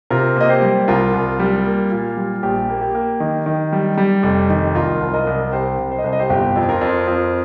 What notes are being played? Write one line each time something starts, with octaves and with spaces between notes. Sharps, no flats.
C3 F4 A#4
A#3 D#5
G4 C5
G3
C2 F4 A#4
C2
G3
A#3
A#2
G3
A#1 G4
A#3
G4
A#3
D#3
D#3
G3
G3
F1
D#3
C2 F4 A#4
C2
A#4 D#5
C2
C2 G4 C5
C2
C5
D#5
C2 C5
D#5
G4 C5
G1 G4
F2
F4 A#4
F2
F2